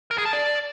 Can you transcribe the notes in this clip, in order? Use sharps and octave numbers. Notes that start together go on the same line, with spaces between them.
A#4
G#4
A5
D5